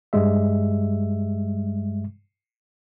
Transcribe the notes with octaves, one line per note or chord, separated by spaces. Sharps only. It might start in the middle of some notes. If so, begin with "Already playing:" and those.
G2 G3 G#3 E5